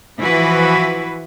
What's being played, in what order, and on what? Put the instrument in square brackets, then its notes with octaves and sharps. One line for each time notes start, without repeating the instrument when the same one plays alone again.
[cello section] E3 F3 E4 F#4 B4